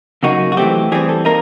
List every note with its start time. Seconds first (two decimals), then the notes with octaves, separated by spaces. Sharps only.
0.23 C#3 F#3 A#3 D#4 F#4
0.52 F#4
0.57 E3 A3 C4 G4
0.92 E3 G3 C4 G#4
1.09 A4
1.25 A#3 D#4 A#4